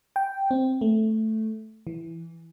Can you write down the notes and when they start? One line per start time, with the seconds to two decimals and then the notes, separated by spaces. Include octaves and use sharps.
0.16 G5
0.51 C4
0.81 A3
1.87 E3